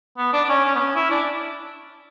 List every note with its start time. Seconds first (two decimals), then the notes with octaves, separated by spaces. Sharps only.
0.18 B3
0.33 D4
0.44 D4
0.49 C#4
0.65 C#4
0.75 B3
0.80 C#4
0.96 E4
1.11 D4